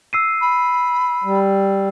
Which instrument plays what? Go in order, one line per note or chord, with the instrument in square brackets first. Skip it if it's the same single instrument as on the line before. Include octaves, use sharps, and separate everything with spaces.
[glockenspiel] E6 C7 D#7
[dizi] B5
[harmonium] G3